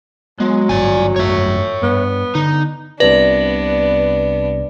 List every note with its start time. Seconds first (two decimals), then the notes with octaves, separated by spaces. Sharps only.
0.40 F#3 G#3 B3
0.69 G#1 G2 D5 G#5
1.16 G#1 F#2 A3 C#5 E5
1.83 G2 B3
2.35 D3 D#4
3.00 C2 C3 B3 D4 B4 D5 A#6